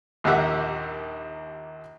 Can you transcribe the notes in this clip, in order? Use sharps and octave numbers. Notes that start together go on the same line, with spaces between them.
A#1 D#2 A#3 G4 E5 F#5